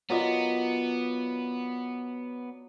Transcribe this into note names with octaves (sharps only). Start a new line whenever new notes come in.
F#3 B3 F4 A#4 D5 D#5